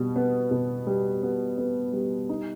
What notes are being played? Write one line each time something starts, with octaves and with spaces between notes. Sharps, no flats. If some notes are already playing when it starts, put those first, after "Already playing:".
Already playing: B2 G3
B3
B2
G3
B3
B3
G3
D#4